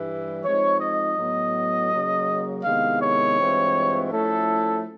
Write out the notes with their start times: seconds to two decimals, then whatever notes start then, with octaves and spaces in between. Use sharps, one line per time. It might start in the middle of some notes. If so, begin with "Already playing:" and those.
Already playing: G2 E3 G3
0.43 F3 G#3 C4 D#4 C#5
0.81 D#5
1.17 A2 F#3 B3
1.91 C#3 F#3 A#3
2.64 C3 D#3 G#3 B3 E4 F5
3.01 C#5
3.39 G2 E3 G#3 C4 F4
4.11 F3 A3 C#4 E4 A4